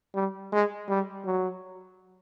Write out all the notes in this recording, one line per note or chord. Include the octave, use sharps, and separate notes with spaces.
G3
G#3
G3
F#3